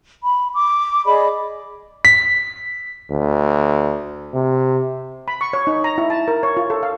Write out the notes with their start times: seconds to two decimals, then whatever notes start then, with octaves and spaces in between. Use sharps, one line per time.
0.22 B5
0.53 D6
1.05 G#4 D5 D#5 B5
2.05 B6
3.10 D2
4.34 C3
5.28 B5
5.41 C#6
5.53 C#5
5.67 D#4
5.84 A#5
5.98 E4
6.10 A5
6.28 A#4
6.43 C#5
6.57 F4
6.70 A4
6.83 F5